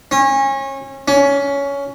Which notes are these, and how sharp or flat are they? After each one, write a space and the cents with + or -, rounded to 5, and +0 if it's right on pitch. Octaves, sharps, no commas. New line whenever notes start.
C#4 -30
C#4 +15